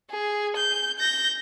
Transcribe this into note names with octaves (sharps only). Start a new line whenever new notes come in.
G#4
G6
G6 A#6